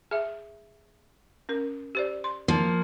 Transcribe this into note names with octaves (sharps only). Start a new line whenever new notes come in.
G#4 E5
C#4 A#4
G4 C5 D5
C6
F3 A#3